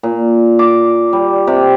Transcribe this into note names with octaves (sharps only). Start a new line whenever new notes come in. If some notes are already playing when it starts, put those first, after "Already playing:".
A#2
D6
G3
C3